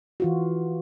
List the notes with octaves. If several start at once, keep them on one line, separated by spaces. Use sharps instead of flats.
E3 F4 F#4